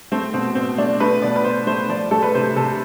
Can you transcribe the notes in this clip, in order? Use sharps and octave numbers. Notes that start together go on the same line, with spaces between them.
A3 C4
B2 C4
B2 C4
A3 D4
A3 B4
B2 D5
B4
B2 C5
A3 C5
F3 D5
A3 A4
B4
C3 C5
C3 A4